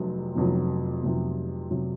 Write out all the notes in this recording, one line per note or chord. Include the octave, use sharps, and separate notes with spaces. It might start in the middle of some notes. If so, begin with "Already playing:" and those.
Already playing: F1 F2 C3 F#3
F1 F2 C3 F#3
F1 F2 C3 F#3
C3 F#3